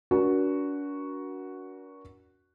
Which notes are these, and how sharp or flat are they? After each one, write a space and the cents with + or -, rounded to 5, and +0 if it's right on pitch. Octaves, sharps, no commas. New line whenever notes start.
D4 -45 F#4 +0 A#4 +35